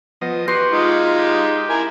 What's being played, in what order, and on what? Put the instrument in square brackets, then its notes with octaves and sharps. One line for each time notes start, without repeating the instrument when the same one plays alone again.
[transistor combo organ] F3 D#5 [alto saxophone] B3
[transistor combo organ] F#4 G4 [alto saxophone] B4 [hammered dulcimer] C6
[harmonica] G#3 D#4 F5 [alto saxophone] F4
[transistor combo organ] G4
[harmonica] E4 A#4 [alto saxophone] G#5